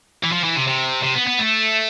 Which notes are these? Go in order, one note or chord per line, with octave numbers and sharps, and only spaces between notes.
E3
F3
E3
C3
C3
C3
B3
B3
A3